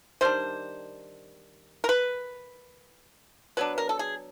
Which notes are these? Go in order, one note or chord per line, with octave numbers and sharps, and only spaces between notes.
D#3 G3 D4 C5
A#4
B4
F#3 B3 D4 B4
A#4
A4
G#4